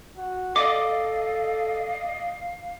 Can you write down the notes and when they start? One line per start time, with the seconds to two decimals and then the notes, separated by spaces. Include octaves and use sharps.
0.18 F#4
0.56 A4 D5 D#5 F5 D6